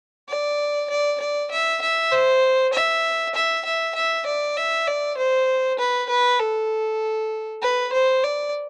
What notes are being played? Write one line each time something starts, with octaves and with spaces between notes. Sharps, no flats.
D5
D5
D5
E5
E5
C5
E5
E5
E5
E5
D5
E5
D5
C5
B4
B4
A4
B4
C5
D5